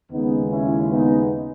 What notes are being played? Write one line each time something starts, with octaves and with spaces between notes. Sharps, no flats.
D#2 C#3 G#3 B3 D#4
C#4 E4
B3 D#4